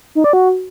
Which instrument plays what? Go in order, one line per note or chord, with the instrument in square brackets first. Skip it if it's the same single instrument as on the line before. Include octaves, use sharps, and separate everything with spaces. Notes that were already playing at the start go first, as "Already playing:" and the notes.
[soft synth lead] D#4
D5
F#4